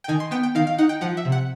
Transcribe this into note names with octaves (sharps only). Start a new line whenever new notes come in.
G5
D#3 G#5
C6
B3 G5
G5
D#3 F5
F5
D#4 F#5
G5
F3 F#5
E5
C3
F#5